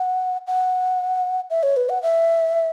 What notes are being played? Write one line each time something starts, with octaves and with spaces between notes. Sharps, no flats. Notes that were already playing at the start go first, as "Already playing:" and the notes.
Already playing: F#5
F#5
E5
C#5
B4
F#5
E5